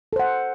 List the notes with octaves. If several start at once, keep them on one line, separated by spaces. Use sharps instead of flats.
A4 C5 F#5